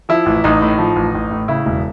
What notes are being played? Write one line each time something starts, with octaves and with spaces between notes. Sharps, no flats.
F3 E4
A1
A1 D#4
A2
F3
A1
A1
A2
C#3 E4
E1